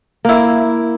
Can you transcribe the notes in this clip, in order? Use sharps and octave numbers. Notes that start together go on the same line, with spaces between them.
A#3 E4